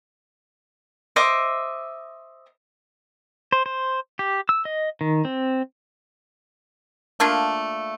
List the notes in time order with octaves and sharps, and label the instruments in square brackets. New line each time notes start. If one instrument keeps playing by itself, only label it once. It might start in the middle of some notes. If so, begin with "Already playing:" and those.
[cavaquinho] C5 D#5 E5 D6
[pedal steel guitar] C5
C5
G4
E6
D#5
D#3
C4
[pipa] A3 A#3 D4 F4